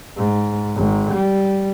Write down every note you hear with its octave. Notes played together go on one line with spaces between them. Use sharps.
G#2
G#1
G3